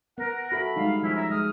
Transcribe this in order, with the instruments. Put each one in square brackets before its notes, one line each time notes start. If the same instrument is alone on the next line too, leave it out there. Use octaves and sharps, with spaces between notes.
[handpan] B3 [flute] A#4 [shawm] F#5
[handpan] F#4 A4 E5 [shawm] B5
[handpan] G3 G#3 D#4 [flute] F5
[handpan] F3 [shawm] C#4 [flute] E4
[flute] E5 [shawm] A#5
[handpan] G#3 G#4 [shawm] D#6 [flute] F6